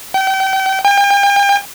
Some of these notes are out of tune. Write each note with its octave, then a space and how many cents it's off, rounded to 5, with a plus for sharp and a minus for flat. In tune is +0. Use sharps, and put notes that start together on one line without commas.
G5 -35
G5 +40